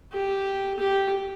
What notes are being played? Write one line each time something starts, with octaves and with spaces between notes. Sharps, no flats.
G4
G4